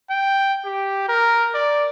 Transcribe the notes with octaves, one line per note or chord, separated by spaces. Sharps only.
G5
G4
A#4
D5